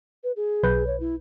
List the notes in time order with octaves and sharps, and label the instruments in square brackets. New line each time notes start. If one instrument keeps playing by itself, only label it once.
[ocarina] B4
G#4
[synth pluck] B1 B4 G6
[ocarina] C#5
E4